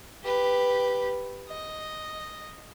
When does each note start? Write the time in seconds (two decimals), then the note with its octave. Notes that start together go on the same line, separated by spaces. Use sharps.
0.23 G4 B4
1.49 D#5